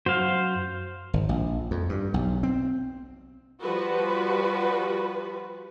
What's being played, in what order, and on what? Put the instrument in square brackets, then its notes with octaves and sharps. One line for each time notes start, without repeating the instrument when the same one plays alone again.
[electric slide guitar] F#2 F#4 [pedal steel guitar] C5 F5
[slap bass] G#1
A#1
F2
G2
B1
C4
[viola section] F3 G3 F#4 B4